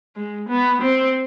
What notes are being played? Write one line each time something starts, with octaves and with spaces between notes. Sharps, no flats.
G#3
B3
C4